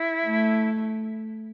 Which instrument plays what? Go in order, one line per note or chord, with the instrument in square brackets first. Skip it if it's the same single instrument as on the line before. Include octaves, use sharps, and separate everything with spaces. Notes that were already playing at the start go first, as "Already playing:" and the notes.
Already playing: [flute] E4
[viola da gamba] A3